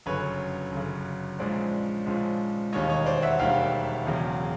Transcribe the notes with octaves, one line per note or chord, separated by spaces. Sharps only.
G1 F#2 C#3 B4 C#5
G1 F#2 C#3
A#1 G#2 F3 G#3 C#4 C5 D5
A#1 G#2 F3 G#3 C#4
E1 D#2 D#3 G3 C#5 D#5
C#5 D#5
C5 D5
E5 F#5
E1 D#2 D#3 G3 F5 G5
E1 E2 C#3 F#3